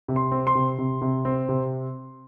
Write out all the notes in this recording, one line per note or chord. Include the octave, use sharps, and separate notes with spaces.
C3
C6
C4
C6
C3
C3
C3
C4
C3